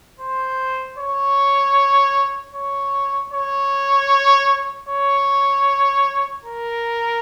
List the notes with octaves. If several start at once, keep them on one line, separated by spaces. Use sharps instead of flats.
C5
C#5
C#5
C#5
C#5
A#4